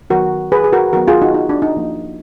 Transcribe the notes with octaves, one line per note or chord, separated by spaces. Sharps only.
D#3 F#3 B3 F#4 A#4
G#4 B4
G#4
F#4 A#4
D#3 F#3 B3 F#4 A#4
F4 G#4
D#4 F#4
D#4
D4
D#4
F3 A#3